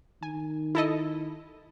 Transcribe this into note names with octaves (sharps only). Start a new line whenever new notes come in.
D#3 G#5
E4 A4 D#5